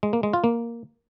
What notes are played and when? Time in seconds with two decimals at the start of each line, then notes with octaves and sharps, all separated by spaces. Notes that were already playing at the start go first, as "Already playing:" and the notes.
0.03 G#3
0.13 A#3
0.23 G#3
0.33 F4
0.44 A#3